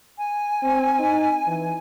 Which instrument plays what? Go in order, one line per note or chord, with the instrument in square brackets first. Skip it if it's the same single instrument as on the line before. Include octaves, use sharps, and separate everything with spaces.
[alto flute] G#5
[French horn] C4
D#4
E3